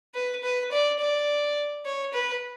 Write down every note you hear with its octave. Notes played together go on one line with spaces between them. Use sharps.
B4
B4
D5
D5
C#5
B4